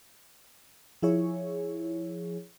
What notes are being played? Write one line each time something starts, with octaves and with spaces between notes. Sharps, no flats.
F3 E4 G#4 C#5